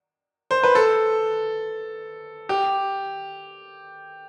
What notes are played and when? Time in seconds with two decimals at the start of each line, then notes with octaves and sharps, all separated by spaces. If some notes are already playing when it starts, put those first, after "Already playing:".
0.51 C5
0.63 B4
0.75 A4
2.49 G4